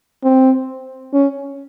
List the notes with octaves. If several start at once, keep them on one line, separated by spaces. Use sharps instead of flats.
C4
C#4